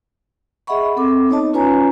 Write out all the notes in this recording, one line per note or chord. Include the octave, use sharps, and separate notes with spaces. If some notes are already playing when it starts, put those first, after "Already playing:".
G#4 D#5 E5 F#5 B5 C#6
C4 A4 D6
B3 D#4 C#5 D#5 A5
C#4 F4 B4 C#5 G#5 A#5